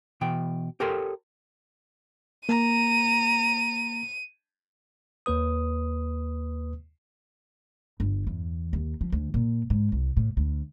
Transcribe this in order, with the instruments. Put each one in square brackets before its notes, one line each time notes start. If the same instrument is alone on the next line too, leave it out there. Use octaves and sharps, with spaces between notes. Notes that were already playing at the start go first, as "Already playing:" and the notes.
[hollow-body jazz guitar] B2 E3 G5
G4 A4 A#4 C#5 G5 C6
[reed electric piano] A#3 [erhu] A#5 [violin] D#7
[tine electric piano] D#2 A#3 B4 D#6
[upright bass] G1
E2
D#2
F3
D2
A#2
G#2
C2
A2
D2